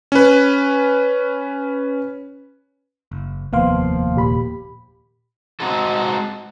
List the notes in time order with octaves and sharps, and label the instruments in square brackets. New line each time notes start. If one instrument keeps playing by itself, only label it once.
[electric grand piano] C#4 B4
[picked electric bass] F#1
[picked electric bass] F1 D#2 A#3 [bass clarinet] F3 [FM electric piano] B3 F5 C6
[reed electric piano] A#2 G4 B5
[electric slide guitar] G#3 C4 D#4 F#4 A4